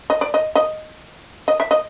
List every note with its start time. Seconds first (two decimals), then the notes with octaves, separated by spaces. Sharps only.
0.10 D#5
0.21 D5
0.34 D#5
0.55 D#5
1.48 D#5
1.60 E5
1.71 D#5